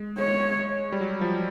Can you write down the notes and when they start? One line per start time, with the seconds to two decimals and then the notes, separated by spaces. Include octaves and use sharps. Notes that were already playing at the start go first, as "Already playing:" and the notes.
Already playing: G#3
0.18 G#3 C#5
0.92 G3
1.01 F#3
1.21 F3